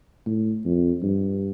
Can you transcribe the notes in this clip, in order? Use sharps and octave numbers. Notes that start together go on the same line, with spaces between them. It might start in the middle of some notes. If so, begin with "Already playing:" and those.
A2
F2
G2